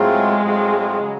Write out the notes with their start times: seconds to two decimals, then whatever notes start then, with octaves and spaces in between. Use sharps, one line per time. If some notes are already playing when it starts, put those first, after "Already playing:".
Already playing: A2 F#3 G#3 A3 C4 F4
0.43 A2 F#3 A3 C4 F4
0.99 C#3 F#3